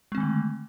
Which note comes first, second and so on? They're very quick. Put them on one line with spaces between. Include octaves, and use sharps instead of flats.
G#3 C4 D#3 A3 D3